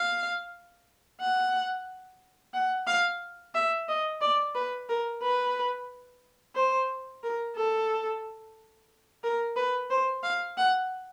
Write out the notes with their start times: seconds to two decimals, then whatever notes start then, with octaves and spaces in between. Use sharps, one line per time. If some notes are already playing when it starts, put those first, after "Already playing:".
Already playing: F5
1.21 F#5
2.54 F#5
2.87 F5
3.55 E5
3.89 D#5
4.21 D5
4.55 B4
4.89 A#4
5.23 B4
6.56 C5
7.23 A#4
7.56 A4
9.24 A#4
9.56 B4
9.90 C5
10.23 F5
10.58 F#5